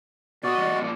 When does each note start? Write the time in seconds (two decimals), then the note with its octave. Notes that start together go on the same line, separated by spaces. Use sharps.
0.43 B2 F#4 D5 D#5
0.58 E2 G3 D#5
0.80 A#2 F3 D5